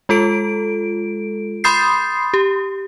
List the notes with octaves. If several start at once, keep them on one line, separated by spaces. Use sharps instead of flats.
G#3 F4 A4 D7
B5 C6 D#6 G6 A6 C7
G4